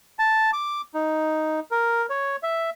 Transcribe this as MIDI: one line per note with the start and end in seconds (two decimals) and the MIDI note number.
0.19 0.51 81
0.53 0.81 86
0.94 1.60 63
1.71 2.06 70
2.10 2.36 73
2.43 2.70 76